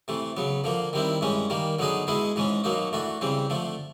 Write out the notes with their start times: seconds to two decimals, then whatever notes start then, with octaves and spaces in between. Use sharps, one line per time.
0.08 C3 E3 A3
0.37 C#3 F#3 B3
0.64 D3 F3 A#3
0.93 D#3 G3 C4 E4
1.21 G2 E3 G#3 C#4
1.50 D#3 G3 A#3
1.79 D3 F#3 B3 D#4 G#4
2.07 B2 G#3 B3 E4 G#4
2.36 G#2 E3 G#3 C#4
2.64 B2 F#3 A#3 D#4
2.93 E3 A3 D4 F#4
3.21 C#3 E3 G3 C4
3.50 D3 F3 A3